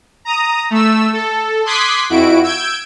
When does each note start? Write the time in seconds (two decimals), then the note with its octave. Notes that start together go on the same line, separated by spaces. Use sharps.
0.25 A#5 D#6
0.70 A3 E6
1.13 A4
1.65 C6 D6 D#6 F#6 G#6 B6
2.10 F2 E4 F#4 D7
2.43 E6 G6 G#6 D7